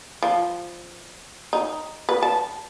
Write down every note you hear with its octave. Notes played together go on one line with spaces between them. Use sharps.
F3
D#4
B4
A5